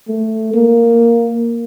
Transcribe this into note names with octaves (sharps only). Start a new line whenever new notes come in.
A3
A#3